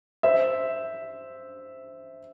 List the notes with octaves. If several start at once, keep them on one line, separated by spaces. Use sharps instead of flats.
C5 E5